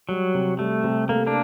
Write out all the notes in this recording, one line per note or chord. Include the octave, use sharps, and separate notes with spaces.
F#3 G3
C3
G3 A3
C3
A3 A#3
A#3 D4